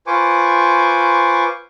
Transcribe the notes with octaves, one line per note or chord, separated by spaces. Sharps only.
F4 B4 C5 G#5 C#6 D6